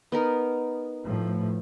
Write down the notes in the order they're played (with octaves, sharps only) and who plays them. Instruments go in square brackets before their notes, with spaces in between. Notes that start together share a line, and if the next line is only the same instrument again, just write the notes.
[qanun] B3 D#4 A#4
[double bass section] A2 F3